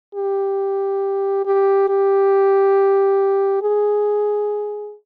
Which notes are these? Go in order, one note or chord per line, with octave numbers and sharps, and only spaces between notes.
G4
G4
G4
G#4